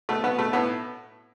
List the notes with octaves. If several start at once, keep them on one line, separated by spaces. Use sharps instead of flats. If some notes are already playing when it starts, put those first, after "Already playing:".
B2 A3
B2 B3
B2 A3
A2 B3